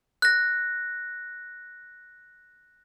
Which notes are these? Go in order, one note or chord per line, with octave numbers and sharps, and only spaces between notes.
F#6 A#6